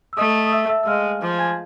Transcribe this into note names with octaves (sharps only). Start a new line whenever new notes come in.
E6
A3 D#5 D#6
D#6
E5 E6
E5 E6
E6
G#3 F5 F6
F3
G#5 G#6